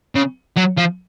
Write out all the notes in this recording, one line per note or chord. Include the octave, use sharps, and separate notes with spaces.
C#3
F#3
F3